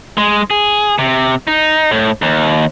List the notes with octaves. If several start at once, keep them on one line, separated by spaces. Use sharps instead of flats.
G#3
G#4
C3
D#4
A2
D#2